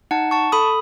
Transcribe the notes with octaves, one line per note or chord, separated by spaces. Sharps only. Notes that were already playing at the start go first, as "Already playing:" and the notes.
D#4 F#5 A5
A5 C#6
A4 B5 D#6